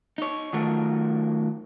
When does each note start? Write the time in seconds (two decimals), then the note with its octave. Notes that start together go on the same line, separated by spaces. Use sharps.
0.18 D#4 C#5
0.53 D#3 F#3 A3 F4 A#4